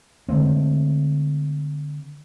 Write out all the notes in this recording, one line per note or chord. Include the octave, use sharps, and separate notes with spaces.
D3 G#3 A3 C4